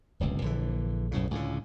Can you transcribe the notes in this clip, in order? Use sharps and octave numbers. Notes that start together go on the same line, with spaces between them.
D1 G1 C#2
A#1 D3 E3
B1 F#2 A2 C#3
C#2 A2 D3